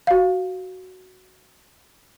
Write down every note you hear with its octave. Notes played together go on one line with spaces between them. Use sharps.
F#4 F5